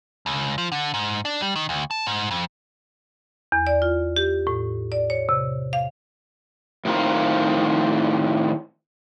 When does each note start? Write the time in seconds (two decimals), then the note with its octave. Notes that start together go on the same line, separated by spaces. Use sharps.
0.26 C#2
0.58 F3
0.72 D3
0.94 G#2
1.25 D4
1.42 G3
1.56 D#3
1.69 D2
1.91 A5
2.07 G#2
2.31 F2
3.52 E2
3.67 D5
3.82 F4
4.16 G4
4.47 A2
4.92 D5
5.10 C#5
5.29 C3
5.73 F5
6.85 A2 D#3 C4 F4 A#5